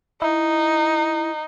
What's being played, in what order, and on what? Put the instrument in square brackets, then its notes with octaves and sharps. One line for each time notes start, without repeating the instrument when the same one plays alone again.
[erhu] D#4 [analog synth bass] E4